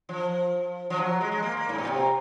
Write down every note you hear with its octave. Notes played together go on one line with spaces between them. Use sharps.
F3
F3
F#3
G#3
G#3
A#3
A#3
G#2
A#2
C3